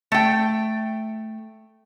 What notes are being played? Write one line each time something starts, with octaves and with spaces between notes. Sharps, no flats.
A3 G5